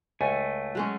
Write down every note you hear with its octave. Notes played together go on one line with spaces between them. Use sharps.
C#2 A3 G#5
F#3 G#3 C#4